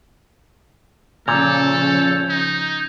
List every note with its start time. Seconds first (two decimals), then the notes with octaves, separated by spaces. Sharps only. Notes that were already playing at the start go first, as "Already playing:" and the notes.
1.28 A#2 C#3 F3 C#4 A4 G6 G#6 F7
2.29 D#4